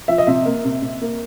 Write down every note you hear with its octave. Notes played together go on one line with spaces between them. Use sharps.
F3 E5
D#5
C3 E5
A#3
C3
C3
A#3